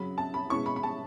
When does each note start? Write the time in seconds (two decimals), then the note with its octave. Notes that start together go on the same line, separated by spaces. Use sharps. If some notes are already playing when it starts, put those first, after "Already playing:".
Already playing: F#2 C#3 F#3 B5
0.18 A5
0.34 B5
0.50 B2 G#3 C#4 E4 C#6
0.66 B5
0.76 B5
0.83 A5